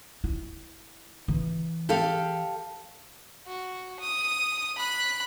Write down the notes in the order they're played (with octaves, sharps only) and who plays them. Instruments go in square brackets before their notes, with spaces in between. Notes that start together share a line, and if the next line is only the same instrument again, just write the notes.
[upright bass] E4
E3
[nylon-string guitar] G4 A4 F5
[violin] F#4
D#6
B5 F#6